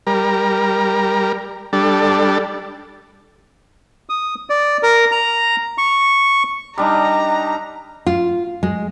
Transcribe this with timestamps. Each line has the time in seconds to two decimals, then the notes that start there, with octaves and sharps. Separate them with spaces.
0.07 G3 A#4
1.73 G3 D4 A4
4.09 D#6
4.50 D5
4.83 A#4
5.12 A#5
5.78 C#6
6.78 G3 D4 D#4 A#5
8.06 F4
8.63 G#3